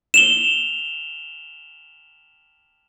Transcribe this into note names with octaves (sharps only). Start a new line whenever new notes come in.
E7 F7 G7